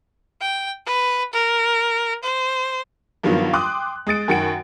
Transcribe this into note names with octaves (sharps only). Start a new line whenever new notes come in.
G5
B4
A#4
C5
G2 D#3 F3 F#3 A#3 B3
G5 C6 D6 D#6 F#6
G#3 D#6 A6 D7
F#2 D#3 F#4 F#5 G5 D7